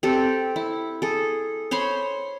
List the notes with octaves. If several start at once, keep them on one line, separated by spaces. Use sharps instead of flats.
C4 G4 A4
E4
G#4 A4
C5 C#5 B5 C6